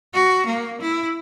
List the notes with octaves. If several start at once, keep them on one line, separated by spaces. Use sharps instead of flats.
F#4
A#3
E4